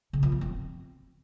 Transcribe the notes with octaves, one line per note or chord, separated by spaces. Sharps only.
C#3
F3
A#3
C4